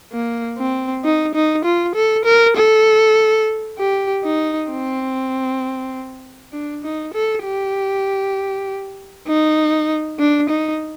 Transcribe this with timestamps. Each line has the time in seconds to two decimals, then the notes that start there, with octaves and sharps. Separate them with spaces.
0.13 A#3
0.58 C4
1.04 D#4
1.34 D#4
1.65 F4
1.95 A4
2.25 A#4
2.57 A4
3.79 G4
4.24 D#4
4.70 C4
6.53 D4
6.84 D#4
7.14 A4
7.44 G4
9.27 D#4
10.19 D4
10.49 D#4